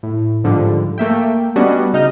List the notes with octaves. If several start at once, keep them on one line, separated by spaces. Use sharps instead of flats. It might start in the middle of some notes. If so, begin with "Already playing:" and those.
A2
G#2 D3 F3 G3
A3 A#3 E5 G5
G3 B3 C#4 D4 F#4 D#5
C#3 D#4 D#5 F6 G6